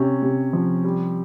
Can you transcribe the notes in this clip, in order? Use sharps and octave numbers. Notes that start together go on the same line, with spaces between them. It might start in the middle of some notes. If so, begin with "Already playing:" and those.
Already playing: C3 C#4
C3
F3
G3